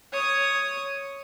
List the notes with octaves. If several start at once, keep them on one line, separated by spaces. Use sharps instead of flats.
C#5 D#6